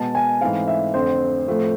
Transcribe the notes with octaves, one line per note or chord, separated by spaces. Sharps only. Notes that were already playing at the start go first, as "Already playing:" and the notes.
Already playing: B2 G#3 B3 A5
G#5
G#2 E3 A3 C4 F5
E5
F2 D3 A3 C4 C5
A2 F3 A3 C4